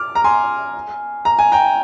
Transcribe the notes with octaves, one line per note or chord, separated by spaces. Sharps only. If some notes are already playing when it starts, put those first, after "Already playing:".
Already playing: D6 F6
A#5
G#5 C6
A#5
G#5
G5 A#5